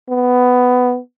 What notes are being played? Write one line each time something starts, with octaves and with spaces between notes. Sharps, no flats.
B3